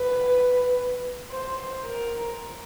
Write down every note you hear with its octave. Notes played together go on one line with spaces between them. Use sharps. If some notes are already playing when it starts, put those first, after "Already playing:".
Already playing: B4
C5
A#4